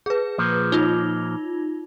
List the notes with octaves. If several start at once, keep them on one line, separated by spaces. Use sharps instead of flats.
G#4 B4
A#2 F3
D#4 F4